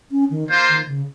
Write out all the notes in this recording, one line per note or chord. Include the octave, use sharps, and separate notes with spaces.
C#4
D#3
A#3 F4 C5
D#3
C#3